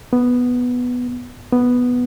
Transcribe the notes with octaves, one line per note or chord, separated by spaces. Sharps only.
B3
B3